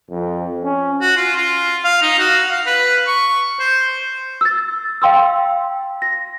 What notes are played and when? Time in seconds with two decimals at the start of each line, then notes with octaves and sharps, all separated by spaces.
0.10 F2
0.65 C#4
1.01 F#4
1.17 F4
1.36 F4
1.84 F5
2.02 D#4
2.19 F#4
2.51 F5
2.67 B4
3.07 C#6
3.60 C5
4.41 E6 A6
5.02 F5 G5 C6 E6
6.02 A#6